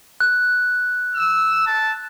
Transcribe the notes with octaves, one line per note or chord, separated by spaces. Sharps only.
F#6
E6
A5